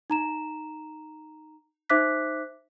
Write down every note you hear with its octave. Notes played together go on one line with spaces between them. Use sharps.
D#4 A#5 E7
D#4 C5 E5 D6 F#6 B6